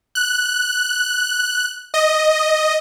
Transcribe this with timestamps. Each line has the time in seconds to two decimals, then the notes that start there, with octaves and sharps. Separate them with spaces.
0.15 F#6
1.94 D#5